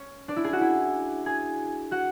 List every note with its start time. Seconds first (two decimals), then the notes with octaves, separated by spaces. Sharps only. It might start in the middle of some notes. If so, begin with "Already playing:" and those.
Already playing: C#4 C#5
0.28 D4 D5
0.36 E4 E5
0.44 G#4 G#5
0.53 F#4 F#5
0.61 E4 E5
1.26 G#4 G#5
1.91 F#4 F#5